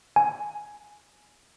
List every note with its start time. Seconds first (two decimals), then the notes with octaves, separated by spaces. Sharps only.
0.16 G#5